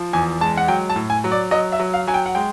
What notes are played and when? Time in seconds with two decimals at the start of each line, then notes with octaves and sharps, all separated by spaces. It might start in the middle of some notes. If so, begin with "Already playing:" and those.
Already playing: F3
0.13 E2 G#5
0.41 G#3 A5
0.57 F#5
0.68 F#3 G5
0.90 A5
0.96 A2
1.10 G#5
1.24 F#3
1.31 D5
1.51 F#3 D#5
1.72 E5
1.79 F#3
1.94 F5
2.07 F#3 G#5
2.14 G5
2.26 F#5
2.35 G#3 G5